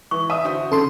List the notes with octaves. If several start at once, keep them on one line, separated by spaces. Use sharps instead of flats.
E3 C#6
E5 D#6 D#7
D3 F#4 C5
C#3 A4 C6